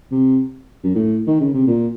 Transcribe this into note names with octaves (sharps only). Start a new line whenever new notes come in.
C3
F#2
A2
D#3
C#3
C3
A#2